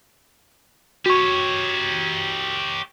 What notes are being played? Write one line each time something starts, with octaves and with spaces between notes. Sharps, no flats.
F#4 G4 C#5 C#6